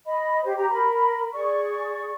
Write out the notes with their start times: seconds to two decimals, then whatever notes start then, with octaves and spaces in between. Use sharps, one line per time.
0.05 D#5 B5
0.44 G4 C5 C#5
0.57 G4 A#5
0.70 A#4 B5
1.33 G#4 D5 C#6